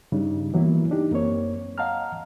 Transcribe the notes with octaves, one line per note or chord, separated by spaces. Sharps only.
G2 C#3 G3 D4 D#4
E3 F#3 A#3 B3 E4
D4 D#4 G4
F#2 A#3 C4 C#5
D#5 F5 F#5 A5 A#5 F6